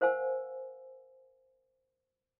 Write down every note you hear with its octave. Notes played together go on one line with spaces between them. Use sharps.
A#4 C5 F5 F#5 G#5 E6